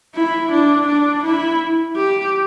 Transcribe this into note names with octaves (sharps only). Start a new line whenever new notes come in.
E4
D4
D4
E4
G4